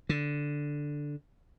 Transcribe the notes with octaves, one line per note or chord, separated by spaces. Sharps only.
D3